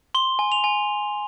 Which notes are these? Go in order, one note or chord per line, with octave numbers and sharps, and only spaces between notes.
C6 G7
G#5
F7
G#5